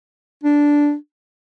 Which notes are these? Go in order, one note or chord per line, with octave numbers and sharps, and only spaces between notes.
D4